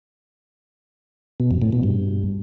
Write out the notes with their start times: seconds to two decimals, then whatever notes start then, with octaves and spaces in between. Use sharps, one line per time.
1.40 B2
1.51 F2
1.62 A2
1.73 B2
1.83 G2